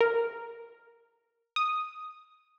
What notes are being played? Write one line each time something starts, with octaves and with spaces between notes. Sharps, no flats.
A#4
D#6